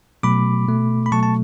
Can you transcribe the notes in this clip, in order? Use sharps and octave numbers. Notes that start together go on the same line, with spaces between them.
B2 F#3 A3 B5 D6
B2 A3
B5
B2 F#3 A3 A5 C#6
A5